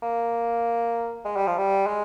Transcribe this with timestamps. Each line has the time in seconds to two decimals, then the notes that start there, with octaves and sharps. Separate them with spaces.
0.02 A#3
1.25 G#3
1.36 G3
1.47 F3
1.58 G3
1.86 G#3